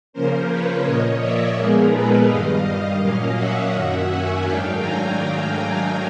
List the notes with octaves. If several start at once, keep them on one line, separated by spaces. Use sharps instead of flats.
C#3 F3 A#3 C#4 A#4 C5
B4 C#5
A#2 F3 A#3 C#5 D#5
D5 E5
A#2 F3 G#3 B3 D#4 G#4 A#4
A4 B4
G2 D#3 G3 D#5 F5
D#5 F5
A#2 F#3 A#3 C#4 D#5 F5
E5 F#5
F#2 D#3 F#3 A#3 C#4 E5 F#5
F#5 G#5
G#2 D#3 F#3 A3 D4 F5 G5
G#5 A#5